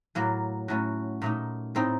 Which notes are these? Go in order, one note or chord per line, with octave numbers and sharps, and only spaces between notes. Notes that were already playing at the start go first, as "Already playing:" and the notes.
A2 F#3 A#3
A2 F#3 A3 C#4 F#4
A#2 A3 D#4
A2 A3 C4 D#4